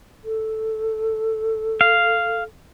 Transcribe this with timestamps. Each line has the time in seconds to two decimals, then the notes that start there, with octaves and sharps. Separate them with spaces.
0.24 A4
1.81 F5